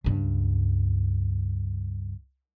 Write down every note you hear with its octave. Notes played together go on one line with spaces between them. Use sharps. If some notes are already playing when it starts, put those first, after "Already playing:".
C#2 G2